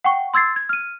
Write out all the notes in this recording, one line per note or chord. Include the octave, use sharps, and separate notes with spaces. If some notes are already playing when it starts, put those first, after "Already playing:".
F#5 G5 C#6
C6 E6 G#6 A6 C7
G#6
F6 D#7